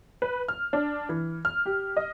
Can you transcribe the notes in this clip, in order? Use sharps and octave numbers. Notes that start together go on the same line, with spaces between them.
B4
F6
D4
E3
F6
G4
D#5